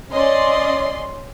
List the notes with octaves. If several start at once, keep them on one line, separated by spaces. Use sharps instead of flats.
C#4 D5 D#5 C6